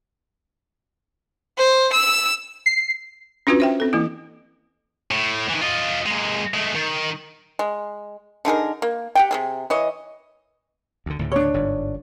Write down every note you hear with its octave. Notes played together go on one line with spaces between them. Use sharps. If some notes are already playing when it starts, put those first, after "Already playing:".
C5
E6
C7
C#4 D4 F4 F#4 B4
C5 E5 G5
C4 A4
E3 A#3 E4
A2
D#3 E3
F4 D#5
G#3 A#3
G#3 A3
D#3
G#3
D3 D#4 G#4 A#4
A#3
G4 F#5 G5
C3 A#3 G#4
E3 C#5 D#5
D2 D3
D2 A2 C#3
D4 C#5
G1 G#2